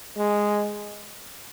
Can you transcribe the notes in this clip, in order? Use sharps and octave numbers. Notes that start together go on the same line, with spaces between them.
G#3